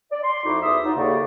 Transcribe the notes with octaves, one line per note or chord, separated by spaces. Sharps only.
D5
C6
F2 A3 D#4 E4 F#4 D6
E2 E5 D#6
F#3 D#4 F4
D#2 A2 C#3 A#3 D5 C#6